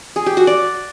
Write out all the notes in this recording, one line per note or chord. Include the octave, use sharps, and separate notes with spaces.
G#4
G4
F#4
D5